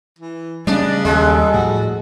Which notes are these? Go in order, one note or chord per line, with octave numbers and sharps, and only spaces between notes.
E3
C#3 G3 A3 C#4 D4 D5 D#5
D#2 G3 G#3 A4
A2 F3 F#4